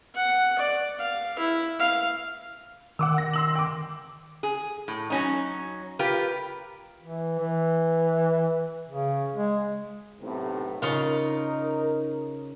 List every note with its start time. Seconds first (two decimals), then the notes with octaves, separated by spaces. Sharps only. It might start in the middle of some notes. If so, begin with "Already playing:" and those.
0.15 F#5
0.59 D5
1.00 F5
1.39 E4
1.80 F5
2.99 D#3 F#5 D6 E6
3.18 A#6
3.33 C6 E6 F#7
3.55 G5 D6
4.43 G#4
4.88 A2
5.10 F#3 C#4 D#4
5.99 F4 G4 A#4 B4
7.02 E3
7.39 E3
8.90 C#3
9.36 G#3
10.21 B1 A2 C3
10.82 C#3 D#4 F4 A#4